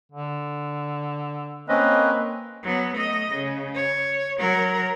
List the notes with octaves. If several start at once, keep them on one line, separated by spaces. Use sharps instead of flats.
D3
A#3 C4 C#4 B4 D#5
F#3 B3
A3 D#5
C#3
C#5
F#3 A#4